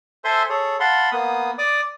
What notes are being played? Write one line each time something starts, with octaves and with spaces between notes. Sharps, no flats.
A4 C5 E5 G#5 C6
G#4 A4 C#5
F5 F#5 A5 B5 C6
A#3 B3 D#6
D5 D6 D#6